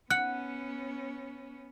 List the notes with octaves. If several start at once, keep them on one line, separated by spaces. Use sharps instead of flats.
B3 C#4 F#5 F#6